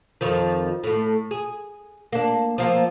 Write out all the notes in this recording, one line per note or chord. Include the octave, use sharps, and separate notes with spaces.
F2 D#3 F3
A2 A3
G#4
A#3 D4
F3 A#3 C4